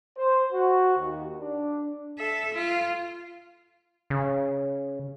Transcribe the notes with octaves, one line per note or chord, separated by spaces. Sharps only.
C5
F#4
D#2
D4
A4 E5
F4
C#3